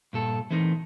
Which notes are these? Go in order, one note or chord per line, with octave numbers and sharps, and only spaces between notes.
G2 A#2 A4
E3 A3 C4 D#4 A#4